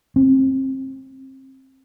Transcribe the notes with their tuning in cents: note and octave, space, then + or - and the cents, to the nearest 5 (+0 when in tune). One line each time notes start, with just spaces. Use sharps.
C4 +30